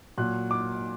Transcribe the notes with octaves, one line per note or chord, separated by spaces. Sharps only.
A#2 F#3 F#6
D6